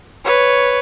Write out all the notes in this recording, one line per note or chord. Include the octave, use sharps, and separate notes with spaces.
B4 C#5